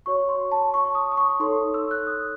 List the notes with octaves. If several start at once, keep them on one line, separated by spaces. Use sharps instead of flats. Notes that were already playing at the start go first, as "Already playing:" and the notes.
F#4 C#5 C#6
C6
A5
C#6
D#6
D#6
C#6
D#4 A4 C#5 C6
E6
F#6
D#6